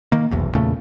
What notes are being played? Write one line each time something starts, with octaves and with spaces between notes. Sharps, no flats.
D#3 A#3
F1 B1 E2
E2 A#2 C#3 A3